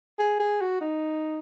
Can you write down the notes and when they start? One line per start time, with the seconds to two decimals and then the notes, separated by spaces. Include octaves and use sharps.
0.19 G#4
0.40 G#4
0.61 F#4
0.81 D#4